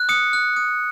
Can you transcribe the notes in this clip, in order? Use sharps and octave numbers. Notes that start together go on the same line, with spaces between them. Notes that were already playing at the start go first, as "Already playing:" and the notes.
Already playing: F#6
D#6 C#7
F#6
D#6